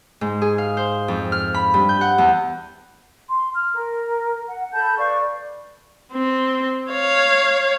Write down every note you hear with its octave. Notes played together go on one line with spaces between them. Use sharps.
G#2
G#4
F5
C5
F2
F6
B5
G2
G6
F#5
E2
C6
F6
A#4
F#5
A4 A5 B5 G6
B4 D5 F5 C#6
C4
C#5 F5